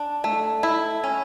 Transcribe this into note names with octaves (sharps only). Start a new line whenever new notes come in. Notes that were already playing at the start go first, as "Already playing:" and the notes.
Already playing: D4
A3
E4
C#4